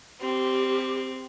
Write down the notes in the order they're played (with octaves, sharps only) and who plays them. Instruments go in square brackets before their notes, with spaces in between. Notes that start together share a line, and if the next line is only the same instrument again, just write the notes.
[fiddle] C4 [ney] G4